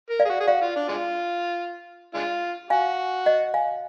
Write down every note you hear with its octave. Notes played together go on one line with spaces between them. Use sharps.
A#4
D5 F5
G#4
F#4
G#4
F#4 D5 F5
F4
D4
G#3 D4 F4
G#3 D4 F4
F#4 F5 G#5
D#5 F#5
F5 G#5